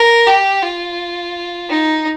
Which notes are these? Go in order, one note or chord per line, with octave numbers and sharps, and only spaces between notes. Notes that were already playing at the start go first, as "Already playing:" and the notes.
Already playing: A#4
G4
F4
D#4